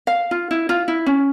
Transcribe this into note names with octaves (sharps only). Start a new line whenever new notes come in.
F5
F4
E4
F4
E4
C#4